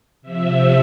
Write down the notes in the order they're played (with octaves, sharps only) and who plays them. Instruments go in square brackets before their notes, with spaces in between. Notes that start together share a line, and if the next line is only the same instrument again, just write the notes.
[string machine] C3 F3 E5